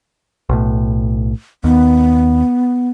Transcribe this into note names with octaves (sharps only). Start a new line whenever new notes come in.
B1 A2
D#2 B3